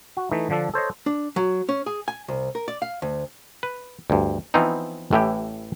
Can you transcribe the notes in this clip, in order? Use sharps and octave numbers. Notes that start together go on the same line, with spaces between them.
F#4
E3 A3 D#4
D3 F3 D4 A4
A4 C5 C#5 D#5
D4
F#3
C#4
G#4
G#5
C2
A#4
D5
F5
D2
B4
D2 G2
E3 F3 B3 C4 D#4
A1 A2 E3 G4